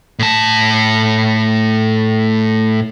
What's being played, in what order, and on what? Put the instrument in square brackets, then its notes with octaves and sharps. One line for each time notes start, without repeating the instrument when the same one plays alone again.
[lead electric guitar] A2 A5